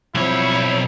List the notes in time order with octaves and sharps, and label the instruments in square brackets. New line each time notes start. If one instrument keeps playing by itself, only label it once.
[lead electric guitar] B1 C#5 [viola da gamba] F3 G3 C4 [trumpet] E4